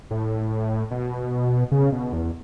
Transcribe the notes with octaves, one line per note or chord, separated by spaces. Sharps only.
A2
B2
C#3
B2
E2